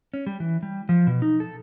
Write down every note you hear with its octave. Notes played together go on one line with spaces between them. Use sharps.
C#4
G3
E3
G3
F3
B2
D#4
A4